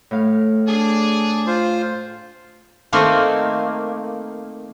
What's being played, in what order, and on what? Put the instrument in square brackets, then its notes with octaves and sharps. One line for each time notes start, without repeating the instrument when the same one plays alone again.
[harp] A2 F5
[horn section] D4 G#4
[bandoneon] F4 C5
[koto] D#3 A3 A#3 C4 D#4